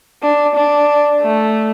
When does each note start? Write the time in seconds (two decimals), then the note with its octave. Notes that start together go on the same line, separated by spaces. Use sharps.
0.23 D4
0.55 D4
1.21 A3